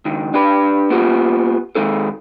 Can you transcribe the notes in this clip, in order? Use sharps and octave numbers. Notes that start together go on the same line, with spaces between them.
C#2 D#3
D4 G4 B4
A#3 B3 F4 G4
D#3 G#3 D#4 A4